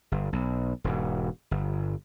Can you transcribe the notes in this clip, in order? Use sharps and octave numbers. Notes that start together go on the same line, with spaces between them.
G1
B1
E1 G#2
G1